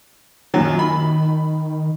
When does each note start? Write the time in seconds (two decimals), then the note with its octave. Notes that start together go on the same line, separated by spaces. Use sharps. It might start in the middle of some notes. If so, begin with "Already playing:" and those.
0.54 F#2 A#2 D#3 F#3
0.79 B5